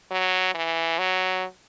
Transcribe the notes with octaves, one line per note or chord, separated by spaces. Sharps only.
F#3
E3
F#3